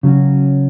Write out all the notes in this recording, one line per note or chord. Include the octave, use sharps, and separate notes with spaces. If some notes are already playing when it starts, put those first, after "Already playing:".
C#3 F#3 C#4 F#4